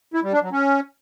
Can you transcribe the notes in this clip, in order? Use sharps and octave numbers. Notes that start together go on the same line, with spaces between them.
E4
G3
D4
F#3
C#4